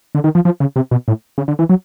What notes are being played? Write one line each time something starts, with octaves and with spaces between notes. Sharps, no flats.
D3
D#3
F3
F3
C#3
C3
B2
A2
C#3
D3
E3
F#3